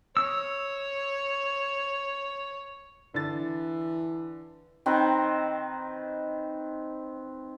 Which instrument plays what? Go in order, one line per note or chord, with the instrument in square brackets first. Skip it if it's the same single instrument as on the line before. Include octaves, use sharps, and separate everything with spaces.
[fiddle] C#5 [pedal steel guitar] E6
[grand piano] D3 A6 [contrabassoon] E3
[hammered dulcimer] D#3 C4 B4